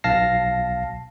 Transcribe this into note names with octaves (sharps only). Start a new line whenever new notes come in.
B1 F5 A5 A#6 C7